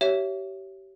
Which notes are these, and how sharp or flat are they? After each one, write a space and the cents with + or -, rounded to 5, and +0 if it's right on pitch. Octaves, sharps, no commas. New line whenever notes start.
G4 -30 C#5 +0 E5 +15